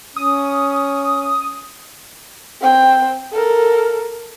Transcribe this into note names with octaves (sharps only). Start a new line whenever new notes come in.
C#4 D#6
C4 G5
A4 A#4